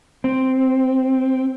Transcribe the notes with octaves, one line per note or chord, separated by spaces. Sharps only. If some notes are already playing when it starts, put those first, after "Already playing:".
C4